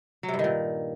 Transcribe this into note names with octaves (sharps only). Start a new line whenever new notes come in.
F#3
C3
G2
D#3
A#2